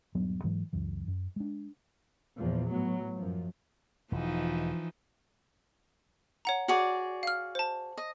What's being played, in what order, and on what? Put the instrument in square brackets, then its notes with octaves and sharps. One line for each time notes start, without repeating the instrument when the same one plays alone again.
[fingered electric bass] D#1 G2 F#3 B3
G#2 E3 F#3 G#3
C#2 F#2 E3
F#2
G#3 D4
[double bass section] E2 A#2 F3
A2 F#3 B3
F#2 F3
[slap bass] E1 [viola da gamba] E3 F3 D#4
[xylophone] C#5 F#5 A#5
[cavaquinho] F#4 G#4 D5
[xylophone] F5 F6
C5 A5
[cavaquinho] D#5